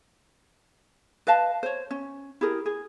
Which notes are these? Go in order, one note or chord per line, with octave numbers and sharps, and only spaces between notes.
B4 D#5 F5 A5
C5 C#5
C#4
E4 G4 G#4 A#4
G#4